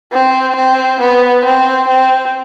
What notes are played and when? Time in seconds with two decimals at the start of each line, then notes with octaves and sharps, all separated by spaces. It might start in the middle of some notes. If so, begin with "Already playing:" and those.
0.12 C4
0.56 C4
1.00 B3
1.45 C4
1.88 C4